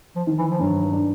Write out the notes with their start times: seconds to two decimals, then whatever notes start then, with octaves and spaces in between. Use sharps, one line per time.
0.15 F3
0.27 D#3
0.38 E3
0.50 F3
0.59 G2 F#3
0.92 D4